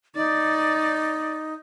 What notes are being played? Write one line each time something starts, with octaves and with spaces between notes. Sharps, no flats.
D#4 D5